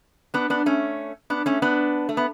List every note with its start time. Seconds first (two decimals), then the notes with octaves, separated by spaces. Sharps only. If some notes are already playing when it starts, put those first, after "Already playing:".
0.34 B3 D4
0.50 B3 D4
0.66 A3 C#4
1.30 B3 D4
1.46 A3 C#4
1.62 B3 D4
2.09 A3
2.17 B3